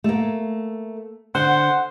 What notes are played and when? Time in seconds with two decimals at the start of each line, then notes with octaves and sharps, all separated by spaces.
0.04 A3 A#3
1.35 D3 C5 F#5